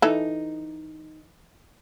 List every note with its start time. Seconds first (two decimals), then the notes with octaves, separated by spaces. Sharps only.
0.02 E3 D#4 A4